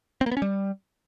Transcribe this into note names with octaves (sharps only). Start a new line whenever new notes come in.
C4
A#3
B3
C#4
G3